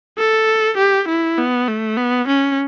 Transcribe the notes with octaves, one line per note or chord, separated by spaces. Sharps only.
A4
G4
E4
B3
A3
B3
C#4